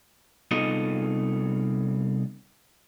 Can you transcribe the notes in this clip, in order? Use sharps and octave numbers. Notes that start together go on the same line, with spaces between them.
C2 B3 D#4 F4 A4 D#5